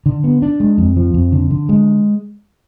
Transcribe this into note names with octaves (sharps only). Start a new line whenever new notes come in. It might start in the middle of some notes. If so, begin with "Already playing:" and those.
D3
B3
D4
G#3
F2
F3
F2
D3
D3
G#3